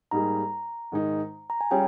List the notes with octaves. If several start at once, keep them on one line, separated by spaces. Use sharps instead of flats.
G#2 G3 A#3 D#4 G#4 A#5
G#2 D#3 G#3 D#4
A#5
G#5
G3 C#4 F4 G#4 C#5 G5